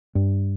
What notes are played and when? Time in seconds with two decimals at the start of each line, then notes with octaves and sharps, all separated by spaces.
0.15 G2